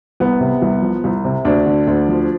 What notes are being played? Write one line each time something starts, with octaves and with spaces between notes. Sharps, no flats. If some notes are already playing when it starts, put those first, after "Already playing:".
C2 B3
C3
C2
F3
C2
C3
D2 D4
D3
D2
F3